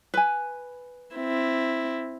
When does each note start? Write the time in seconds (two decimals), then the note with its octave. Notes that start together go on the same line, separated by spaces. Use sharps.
0.14 B4 G#5
1.16 C4 E4